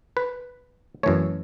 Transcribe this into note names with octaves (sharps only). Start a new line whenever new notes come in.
B4
F#2 E3 A3 C#5